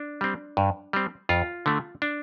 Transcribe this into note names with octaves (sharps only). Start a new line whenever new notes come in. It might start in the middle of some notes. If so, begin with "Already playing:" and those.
Already playing: D4
G3 C4
G2
G3 C4
F2 F4
D3 A3
D4